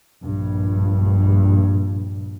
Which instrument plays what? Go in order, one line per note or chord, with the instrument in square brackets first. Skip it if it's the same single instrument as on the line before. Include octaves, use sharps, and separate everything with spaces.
[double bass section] A#1 G2